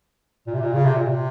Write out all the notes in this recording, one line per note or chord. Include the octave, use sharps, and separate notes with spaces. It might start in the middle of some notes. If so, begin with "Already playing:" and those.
A#2
C3
A#2
C#3
C3
A#2
C3